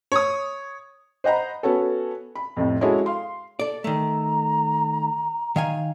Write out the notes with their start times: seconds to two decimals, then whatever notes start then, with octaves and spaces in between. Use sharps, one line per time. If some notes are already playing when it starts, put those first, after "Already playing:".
0.12 C#5 D#6
1.24 C5 D#5 F#5 A#5 B5
1.63 B3 C#4 F#4 A4
2.35 B5
2.57 F2 A2 C3
2.81 G#3 C#4 E4 F#4 G#4 A4
3.06 F5 C6
3.59 A4 D5
3.84 D#3 A3 A#5
5.56 D#3 F5 G#5